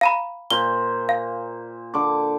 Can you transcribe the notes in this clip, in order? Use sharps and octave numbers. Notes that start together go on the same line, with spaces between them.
F5 A#5 B5
A#2 C5 G7
F5
D3 D6